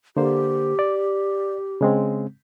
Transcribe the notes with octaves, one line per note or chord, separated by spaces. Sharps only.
D3 A#3 G4 C5
D5
C#3 G#3 C4